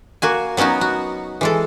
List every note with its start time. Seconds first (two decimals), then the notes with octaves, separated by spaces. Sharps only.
0.22 A#3 F#4 G#5
0.57 F#3 B3 C#4 D#4 F#4
0.81 F#4
1.41 E3 G#3 A4